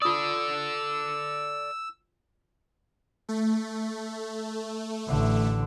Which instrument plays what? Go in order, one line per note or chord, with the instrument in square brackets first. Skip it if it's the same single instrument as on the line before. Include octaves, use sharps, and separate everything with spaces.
[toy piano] F4 D#6 [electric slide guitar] A4 D5 [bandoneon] E6
[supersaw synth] A3
[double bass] A1 D3